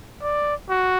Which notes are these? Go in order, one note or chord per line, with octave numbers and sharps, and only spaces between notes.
D5
F#4